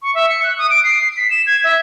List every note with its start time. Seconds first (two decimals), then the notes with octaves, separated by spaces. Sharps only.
0.02 C#6
0.15 E5
0.29 C#7
0.43 F#6
0.58 D#6
0.70 D7
0.84 C7
1.17 B6
1.30 E7
1.46 G#6
1.64 E5